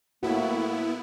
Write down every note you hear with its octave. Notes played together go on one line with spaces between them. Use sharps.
A2 A#3 B3 E4 F#4